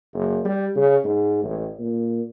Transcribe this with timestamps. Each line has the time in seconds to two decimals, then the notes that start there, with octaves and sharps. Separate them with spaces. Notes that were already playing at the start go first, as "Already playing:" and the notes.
0.14 F#1
0.45 G3
0.76 C#3
1.04 G#2
1.44 A1
1.79 A#2